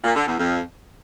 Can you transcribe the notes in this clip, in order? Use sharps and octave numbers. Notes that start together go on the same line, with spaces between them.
A#2
D3
E2
F2